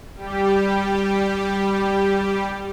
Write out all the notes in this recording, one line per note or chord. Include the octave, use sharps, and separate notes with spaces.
G3 G4